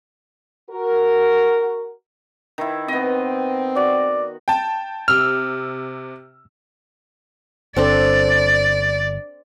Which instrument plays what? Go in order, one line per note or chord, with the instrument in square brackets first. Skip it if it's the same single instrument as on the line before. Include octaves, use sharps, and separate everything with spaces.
[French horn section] F#4 A#4
[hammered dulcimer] D#3 E4
[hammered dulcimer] B3 D#5 [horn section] C4
[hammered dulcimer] F#4 [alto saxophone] D5
[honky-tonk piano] G5 A5
[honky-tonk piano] C3 E6 [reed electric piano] F6
[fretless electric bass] G1 [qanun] C4 D4 A4 [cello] D5